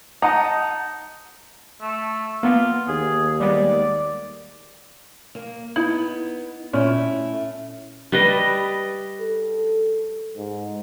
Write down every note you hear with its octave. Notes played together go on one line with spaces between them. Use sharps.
D#4 D#5 F#5 A5
A3
A#3 B3 F4
D#2 G#4
G3 G#3 B3 D5
A#3
B3 D#4 E4
A#2 A3 C#4 E4
G3 B4 D#5
A4
G#2